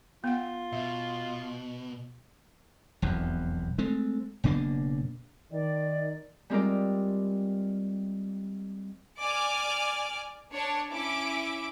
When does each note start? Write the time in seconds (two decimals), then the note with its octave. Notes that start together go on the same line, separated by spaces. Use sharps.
0.24 B3 F4 F#5
0.73 B2 E5
3.02 E1 B1 F2
3.78 G#3 A3 C4
4.44 F#1 B2 A#3 D4
5.52 D#3 D5
6.50 G3 G#3 C4 F4 A#4 D5
9.19 D5 G#5 D6 F6
10.53 D4 C#5 A5
10.92 C#4 E4 E5 D6 D7